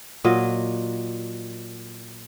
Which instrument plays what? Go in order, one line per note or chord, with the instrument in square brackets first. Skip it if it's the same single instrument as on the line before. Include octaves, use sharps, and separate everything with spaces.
[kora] A#2 F#3 D#5